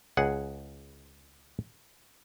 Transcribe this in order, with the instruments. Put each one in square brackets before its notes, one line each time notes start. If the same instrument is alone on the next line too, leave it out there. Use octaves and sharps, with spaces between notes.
[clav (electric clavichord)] C#2 G#4 F#5